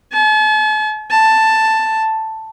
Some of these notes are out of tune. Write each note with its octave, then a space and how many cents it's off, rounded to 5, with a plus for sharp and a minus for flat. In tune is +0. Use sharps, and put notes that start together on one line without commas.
A5 -45
A5 +5